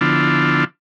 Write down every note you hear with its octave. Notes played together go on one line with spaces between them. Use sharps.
D3 F3 B3 D4 E4 F4